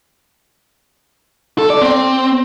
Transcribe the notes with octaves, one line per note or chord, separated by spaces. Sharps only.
A4
D5
C4